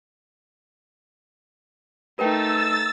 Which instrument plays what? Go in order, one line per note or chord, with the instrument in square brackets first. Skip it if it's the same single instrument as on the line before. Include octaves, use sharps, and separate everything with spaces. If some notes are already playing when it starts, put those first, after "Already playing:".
[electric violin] A3 D#4 [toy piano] A#4 B4 G5 [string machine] E6 A6